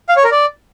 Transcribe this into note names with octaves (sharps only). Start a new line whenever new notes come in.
F5
C#5
A#4
D5